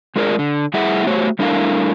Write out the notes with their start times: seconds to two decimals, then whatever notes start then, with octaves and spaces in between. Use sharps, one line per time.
0.16 G#3 A3 F4 G#4 A#4 D5
0.39 D3
0.74 G3 A3 E4 G#4 E5 F#5
1.07 A3 F#4 G4 C5 C#5
1.39 G3 A3 D4 E4 A#4 F5